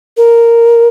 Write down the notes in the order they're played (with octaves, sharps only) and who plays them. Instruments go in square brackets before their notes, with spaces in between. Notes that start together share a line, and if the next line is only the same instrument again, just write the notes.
[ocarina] A#4